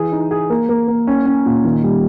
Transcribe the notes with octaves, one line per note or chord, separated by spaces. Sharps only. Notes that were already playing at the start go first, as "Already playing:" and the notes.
Already playing: E3 G#4
D#4
G#4
A#3
A#3
A#3
C#4
C#4
A#2
D#3
G3